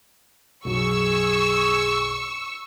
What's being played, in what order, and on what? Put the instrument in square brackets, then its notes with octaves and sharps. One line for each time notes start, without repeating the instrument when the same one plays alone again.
[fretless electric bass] B1 F#2 F#3 [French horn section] G#4 [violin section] C#6 E6